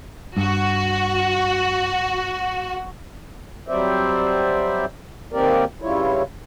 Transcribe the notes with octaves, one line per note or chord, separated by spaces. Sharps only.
G2 F#4
F#3 G3 C4 C5 D5 E5
D#3 A#3 C4 G4 A#4 D5
G2 C#3 G3 E4 F4 C#5